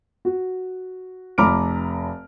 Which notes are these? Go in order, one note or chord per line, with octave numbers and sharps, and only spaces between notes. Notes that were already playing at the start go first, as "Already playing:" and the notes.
F#4
F1 A#5 B5 D6 F6 D7